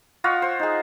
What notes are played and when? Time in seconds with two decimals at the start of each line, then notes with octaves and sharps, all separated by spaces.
0.24 F4 C#5 D#5 F#5
0.42 C5
0.59 D#4 G#4